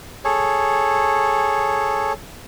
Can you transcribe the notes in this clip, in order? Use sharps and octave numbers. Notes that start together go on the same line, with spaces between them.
G#4 A4 C#5